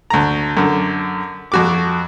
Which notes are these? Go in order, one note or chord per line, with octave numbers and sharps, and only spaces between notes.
D2 A#5
F#2 D3
F2 F#4 D6